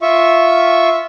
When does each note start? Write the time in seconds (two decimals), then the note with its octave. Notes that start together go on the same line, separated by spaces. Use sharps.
0.02 F4 E5 C#6